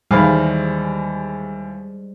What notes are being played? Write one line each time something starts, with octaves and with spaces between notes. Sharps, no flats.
D#2 E3 G3 G#3 C5 F5